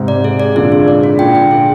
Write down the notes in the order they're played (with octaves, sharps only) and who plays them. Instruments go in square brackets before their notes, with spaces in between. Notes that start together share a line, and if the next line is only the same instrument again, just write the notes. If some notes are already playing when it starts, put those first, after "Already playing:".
Already playing: [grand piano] G#2 C3
[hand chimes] D5
G#4
D5
[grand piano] A#2 D3 [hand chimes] G#4
[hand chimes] G#4
D5
F4
[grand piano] A#2 D3 [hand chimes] G5
[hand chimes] G5
G#4